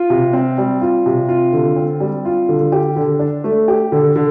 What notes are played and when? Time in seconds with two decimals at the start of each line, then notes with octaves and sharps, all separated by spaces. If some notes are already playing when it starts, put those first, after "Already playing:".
Already playing: F4
0.10 C3
0.33 C4
0.58 G3
0.81 F4
1.06 C3
1.29 F4
1.53 D3
1.76 C4
2.00 G3
2.25 F4
2.49 D3
2.72 G4
2.96 D3
3.19 D4
3.44 A3
3.68 G4
3.92 D3
4.16 D3